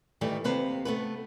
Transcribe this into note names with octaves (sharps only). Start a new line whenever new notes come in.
D#3 E3 G3 A3
D#2 C3 B4 C5
A3 B3 B4